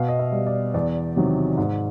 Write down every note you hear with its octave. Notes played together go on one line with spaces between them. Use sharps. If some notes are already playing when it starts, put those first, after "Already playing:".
Already playing: B2 F5
D#5
E5
G3
D5
E2 D5
C3 D#3 F#3
G#2